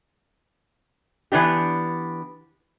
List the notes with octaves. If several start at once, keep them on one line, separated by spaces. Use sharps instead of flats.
E3 B3 D4 G4